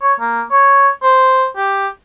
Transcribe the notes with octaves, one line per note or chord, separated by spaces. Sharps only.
C#5
A#3
C#5
C5
G4